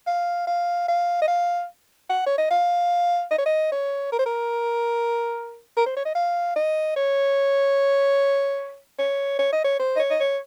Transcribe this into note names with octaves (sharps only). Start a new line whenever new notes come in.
F5
F5
F5
D#5
F5
F#5
C#5
D#5
F5
D#5
C#5
D#5
C#5
A#4
C5
A#4
A#4
C5
C#5
D#5
F5
D#5
C#5
C#5
C#5
D#5
C#5
C5
D#5
C#5
D#5
C#5